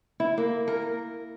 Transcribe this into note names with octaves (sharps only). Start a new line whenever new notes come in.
E4
A#3
A#4